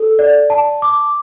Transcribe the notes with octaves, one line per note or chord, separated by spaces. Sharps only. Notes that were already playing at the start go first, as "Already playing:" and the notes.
Already playing: A4
D5
A5
D6